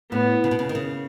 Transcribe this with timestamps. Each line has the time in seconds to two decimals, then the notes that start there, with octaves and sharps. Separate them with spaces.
0.12 A2 B3
0.44 C#3
0.51 B2
0.59 C#3
0.69 D#3
0.75 C#3